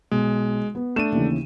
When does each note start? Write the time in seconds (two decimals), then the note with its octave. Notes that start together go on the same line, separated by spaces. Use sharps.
0.11 B1 G#3
0.75 B3
0.96 A3 D4 D#7 E7
1.12 D#2 C#3 E3